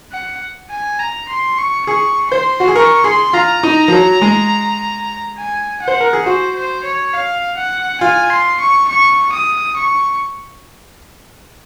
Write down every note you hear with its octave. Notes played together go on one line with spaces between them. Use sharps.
F#5
G#5
A#5
C6
C#6
G#4 C#6
C5 C6
F#4
G#4
A#4 C#6
G#4 C6
F4 A#5
D#4
F3
F#3
G#3
G#5
F#5
C5
A#4
G#4
F#4 C5
C5
C#5
F5
F#5
F4 G#5
C6
C#6
C#6
D#6
C#6